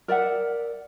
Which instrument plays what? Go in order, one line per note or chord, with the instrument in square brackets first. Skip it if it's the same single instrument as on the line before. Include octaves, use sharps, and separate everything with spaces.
[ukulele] A#4 D5 E5 F#5